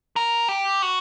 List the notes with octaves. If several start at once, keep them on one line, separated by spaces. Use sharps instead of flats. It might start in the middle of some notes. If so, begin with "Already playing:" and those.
A#4
G4
F#4